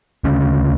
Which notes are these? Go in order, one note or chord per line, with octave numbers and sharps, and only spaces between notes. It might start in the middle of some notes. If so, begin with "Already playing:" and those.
D2 C#3 C#4